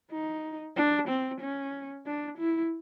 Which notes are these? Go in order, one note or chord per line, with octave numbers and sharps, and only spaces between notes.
D#4
D4
C4
C#4
D4
E4